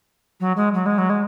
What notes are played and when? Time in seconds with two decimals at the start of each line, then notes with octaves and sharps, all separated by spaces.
0.40 F#3
0.57 G#3
0.74 F#3
0.86 G#3
0.98 F#3
1.10 G#3